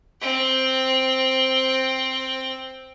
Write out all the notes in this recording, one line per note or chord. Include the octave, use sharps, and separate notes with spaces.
C4 G5